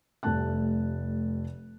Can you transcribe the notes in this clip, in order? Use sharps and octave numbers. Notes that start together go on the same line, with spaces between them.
F1 G3 A3 A5 F#6